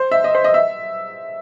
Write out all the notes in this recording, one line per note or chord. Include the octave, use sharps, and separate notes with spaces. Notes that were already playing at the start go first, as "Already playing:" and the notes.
Already playing: C5
E5
D#5
C5
D#5
E5